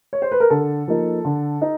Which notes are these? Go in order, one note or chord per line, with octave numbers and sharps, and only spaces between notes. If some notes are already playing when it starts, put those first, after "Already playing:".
C#5
C5
B4
A#4
D3 A4
F3 A#3 D#4
D3
D#4